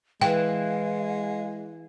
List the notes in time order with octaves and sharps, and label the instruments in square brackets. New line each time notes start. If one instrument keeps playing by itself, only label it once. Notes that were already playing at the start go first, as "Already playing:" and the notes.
[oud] E3 [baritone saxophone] G#3 [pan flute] F5 [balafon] G5